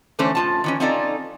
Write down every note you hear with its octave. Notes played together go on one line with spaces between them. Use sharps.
D3 E3 A3 C#4 C5 C#5
A2 F4 A5
D#3 E3 C#4
C4 C#4 D#4 F4 A4 D5